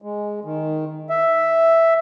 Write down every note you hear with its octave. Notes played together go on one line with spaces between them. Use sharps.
G#3
D#3
E5